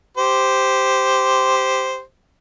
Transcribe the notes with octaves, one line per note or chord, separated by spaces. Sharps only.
G4 C5